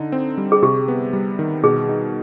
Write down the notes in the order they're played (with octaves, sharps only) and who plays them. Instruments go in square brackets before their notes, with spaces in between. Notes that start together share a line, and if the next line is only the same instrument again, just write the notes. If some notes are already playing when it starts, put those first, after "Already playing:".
Already playing: [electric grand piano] D3 D#4
C4
G3
[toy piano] G#4
[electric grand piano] C3 [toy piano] G4
[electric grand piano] B3
G3
D#3
[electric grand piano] B2 [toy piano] G#4
[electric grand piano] D#4